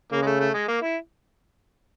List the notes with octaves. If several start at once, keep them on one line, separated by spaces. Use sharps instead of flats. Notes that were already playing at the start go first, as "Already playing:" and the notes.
C#3 A#3
G#3
A3
A3
G#3
A#3
E4